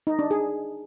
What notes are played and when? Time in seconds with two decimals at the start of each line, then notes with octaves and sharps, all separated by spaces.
0.07 D#4
0.19 D4
0.31 G#4